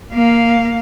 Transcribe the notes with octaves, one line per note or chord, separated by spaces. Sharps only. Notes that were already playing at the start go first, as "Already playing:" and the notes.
A#3 F5